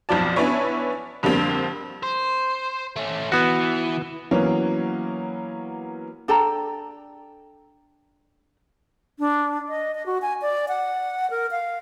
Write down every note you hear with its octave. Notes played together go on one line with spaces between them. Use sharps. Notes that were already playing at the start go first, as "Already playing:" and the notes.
B1 F2 F3 D5 A5
B3 C#4 D4 E4 B4 C#5
F2 D3 G3 A#3 C4
C5
A3 C#4
E3 B3 F#4
E3 F#3 A#3 B3 C#4
D4 A4 G5 A#5
D4
D#5
D#5
F#4
G#5
D5
F#5
A#4
F5